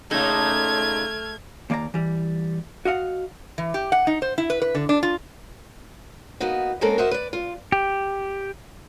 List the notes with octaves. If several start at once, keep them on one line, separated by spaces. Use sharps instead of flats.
A#2 C#3 A3 D#4 A4 F6 G#6
D#2 A#3 D5 A5 A#5
E3 G3
F#4 D#5 F5 F#5
E3
G4
F#5
D#4
C5
E4
B4
B4
D3
D4
F4
A#3 B3 D#4 F#4
G#3 A#3 C4 C#4 A4 A#4
F#4 A#4 C5 D#5 E5
B4 D5
F4
G4